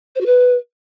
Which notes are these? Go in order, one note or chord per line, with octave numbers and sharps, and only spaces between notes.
C5
F#4
B4